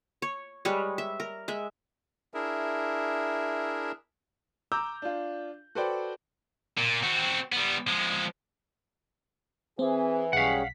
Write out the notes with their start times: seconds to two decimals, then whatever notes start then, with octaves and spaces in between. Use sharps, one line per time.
0.22 C#5
0.65 G3 G#3 B4 C#5
0.98 E5
1.20 A#4
1.48 G#3 E5
2.34 D4 E4 G#4 A#4 E5
4.72 A#5 D6 E6 G6
5.02 D4 F4
5.75 F#4 A4 B4 C5 D5 G5
6.77 A#2
7.03 C4 F#4
7.52 G3 B3
7.88 F3 G#3
9.79 E3 C4 G#4
10.33 B1 G3 C#4 G#4 F5 F#5 B6